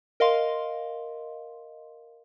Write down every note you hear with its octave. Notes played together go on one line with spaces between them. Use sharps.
A#4 D#5 F5 C6